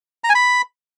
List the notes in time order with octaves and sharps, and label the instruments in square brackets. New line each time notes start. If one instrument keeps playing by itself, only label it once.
[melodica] A#5
G#5
B5